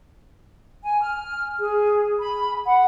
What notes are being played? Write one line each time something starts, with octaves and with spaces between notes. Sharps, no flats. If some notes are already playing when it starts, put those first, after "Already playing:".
G#5
F6
G#4
B5
F#5